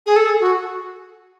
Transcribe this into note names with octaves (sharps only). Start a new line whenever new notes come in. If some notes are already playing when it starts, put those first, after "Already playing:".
G#4
A4
G#4
F#4